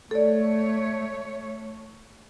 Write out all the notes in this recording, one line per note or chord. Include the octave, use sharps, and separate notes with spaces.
A3 A4 C#5 D5